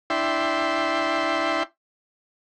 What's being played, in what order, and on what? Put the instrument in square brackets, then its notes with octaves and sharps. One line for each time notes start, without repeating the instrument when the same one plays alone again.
[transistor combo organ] D4 E4 E5 G5 C6